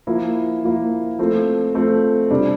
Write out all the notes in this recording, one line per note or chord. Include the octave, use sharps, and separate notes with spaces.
F3 A#3 E4
F3 A#3 E4
F3 A3 C4
F3 A3 C4
C3 G3 D4